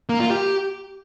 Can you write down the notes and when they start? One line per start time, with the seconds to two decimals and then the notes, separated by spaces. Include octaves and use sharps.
0.09 A#3
0.20 F4
0.31 G4